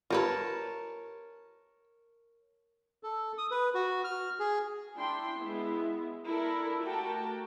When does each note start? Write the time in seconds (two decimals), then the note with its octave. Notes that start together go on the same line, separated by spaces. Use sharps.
0.10 F4 G4 A#4 B4 C#5 A5
3.03 A4
3.38 D#6
3.51 B4
3.75 F#4
4.04 F6
4.39 G#4
4.95 D4 E4 G5 C6
5.37 G#3 B3 E4
6.27 D4 E4 A4 A#4
6.83 A3 F#4 G4 A#4 G5 A5